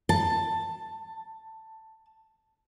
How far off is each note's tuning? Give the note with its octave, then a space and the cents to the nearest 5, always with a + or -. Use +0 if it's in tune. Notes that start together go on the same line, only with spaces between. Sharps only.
A5 +10